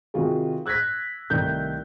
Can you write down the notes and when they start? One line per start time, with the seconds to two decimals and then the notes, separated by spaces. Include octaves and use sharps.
0.14 C3 D#3 F4 F#4 G#4
0.66 E6 F#6 G#6 A#6 B6
1.30 C2 D#3 A3 G6